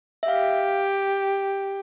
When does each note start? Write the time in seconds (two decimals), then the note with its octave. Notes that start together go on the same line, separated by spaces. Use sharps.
0.23 E5
0.28 G4 F5